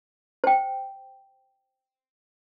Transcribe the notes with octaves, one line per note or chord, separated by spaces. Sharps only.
C5 G5